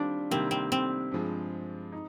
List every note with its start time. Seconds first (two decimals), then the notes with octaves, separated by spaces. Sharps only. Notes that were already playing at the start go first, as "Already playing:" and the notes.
Already playing: D#3 G3 C4 D4 F4
0.31 C3 D#3 G3 A#3 C4
0.51 C4
0.72 C4
1.11 G2 F3 G#3
1.92 D#4